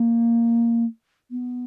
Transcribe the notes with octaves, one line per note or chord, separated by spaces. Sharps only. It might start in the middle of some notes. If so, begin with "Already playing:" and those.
Already playing: A#3
B3